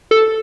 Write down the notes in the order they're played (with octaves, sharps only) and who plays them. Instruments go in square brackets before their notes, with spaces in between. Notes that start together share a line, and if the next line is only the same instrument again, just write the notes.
[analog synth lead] A4